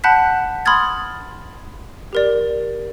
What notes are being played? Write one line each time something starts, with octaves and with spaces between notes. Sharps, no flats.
F#5 A5 B5 F#6 G6 B6
B5 C6 D#6 F6 G#6 A6
G4 A#4 D5